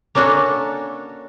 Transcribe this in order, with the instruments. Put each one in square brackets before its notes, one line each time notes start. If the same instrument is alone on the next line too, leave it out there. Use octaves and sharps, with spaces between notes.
[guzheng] A#3 C#4 D4 F#4 A4